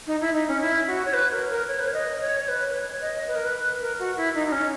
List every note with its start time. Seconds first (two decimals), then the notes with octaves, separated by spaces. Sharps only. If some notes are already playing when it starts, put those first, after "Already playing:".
0.07 D#4
0.21 E4
0.34 D#4
0.48 C#4
0.61 E4
0.87 F#4
1.05 C#5
1.14 B4
1.31 A#4
1.50 A#4
1.68 C#5
1.79 B4
1.87 C#5
1.94 D#5
2.21 C#5
2.40 C#5
2.48 B4
2.69 B4
2.74 C#5
3.01 D#5
3.28 B4
3.35 A#4
3.45 B4
3.81 A#4
3.99 F#4
4.17 E4
4.35 D#4
4.47 D#4
4.52 C#4